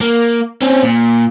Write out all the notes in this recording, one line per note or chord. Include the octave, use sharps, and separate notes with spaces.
A#3
C4 C#4
A#2